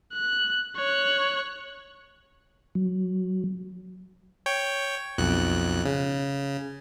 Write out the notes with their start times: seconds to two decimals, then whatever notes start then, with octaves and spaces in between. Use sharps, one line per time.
0.13 F#6
0.77 C#5 F#6
2.75 F#3
4.46 C#5 G5
5.18 B1 F2 F#6
5.85 C#3